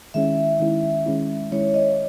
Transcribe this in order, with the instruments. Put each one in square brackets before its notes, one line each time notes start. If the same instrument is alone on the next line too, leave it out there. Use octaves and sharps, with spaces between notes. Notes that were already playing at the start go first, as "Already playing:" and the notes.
[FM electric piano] D#3 G#3 C#4 E4 [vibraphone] E5
[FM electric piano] D#3 G#3 C#4 E4
D#3 G#3 C#4 E4
[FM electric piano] D#3 G#3 C#4 E4 [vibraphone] C#5
[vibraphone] D#5